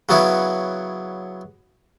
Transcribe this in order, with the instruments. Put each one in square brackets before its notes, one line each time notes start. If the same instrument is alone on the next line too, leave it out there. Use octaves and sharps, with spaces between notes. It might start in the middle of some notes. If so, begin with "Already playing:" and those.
[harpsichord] C#3 F#3 B3 C#4 E4